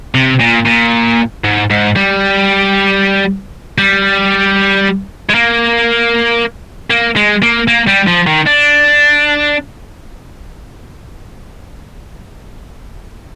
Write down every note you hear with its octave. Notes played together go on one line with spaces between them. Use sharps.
C3
A#2
A#2
G#2
G#2
G3
G3
G#3
A#3
A#3
G#3
A#3
A#3
G3
F3
D#3
D4